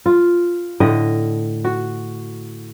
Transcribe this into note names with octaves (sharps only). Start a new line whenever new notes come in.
F4
A2 D3 D#5
F#4